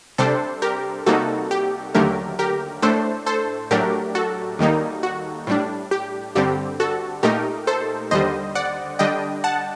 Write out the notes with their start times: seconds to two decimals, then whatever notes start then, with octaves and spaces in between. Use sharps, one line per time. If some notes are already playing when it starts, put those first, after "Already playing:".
0.18 C3 G3 D4 A4 C5
0.62 G4 A#4
1.06 C3 G3 A#3 D#4 F#4 A4
1.51 G4
1.95 D#2 D3 F#3 A3 G4 A#4
2.39 G4 A#4
2.82 A2 A3 D4 A4 C5
3.26 A4 C5
3.71 A2 F#3 A3 D4 G4 A#4
4.15 F#4 A4
4.59 D#2 D#3 G3 A#3 D#4
5.03 F#4
5.47 A2 G3 D4
5.91 G4
6.35 G2 D3 G3 C4 G4
6.80 F#4 A4
7.23 A#2 A3 D#4 G4 A#4
7.67 A4 C5
8.11 D#2 D3 G3 C5 D#5
8.55 D5 F#5
8.99 D3 G3 D4 D#5 G5
9.44 F#5 A5